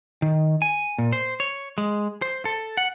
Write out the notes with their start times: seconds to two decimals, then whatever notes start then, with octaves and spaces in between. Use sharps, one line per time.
0.22 D#3
0.62 G#5
0.98 A#2
1.13 C5
1.40 C#5
1.78 G#3
2.22 C5
2.45 A4
2.77 F#5